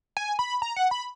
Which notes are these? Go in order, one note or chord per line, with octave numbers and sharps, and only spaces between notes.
G#5
B5
A#5
F#5
B5